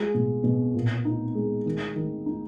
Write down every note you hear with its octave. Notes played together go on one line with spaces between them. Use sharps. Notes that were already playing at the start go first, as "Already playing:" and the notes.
Already playing: G#3 F4
B2
B2
A#2
D#4
G#3
D#3
D#3
D#4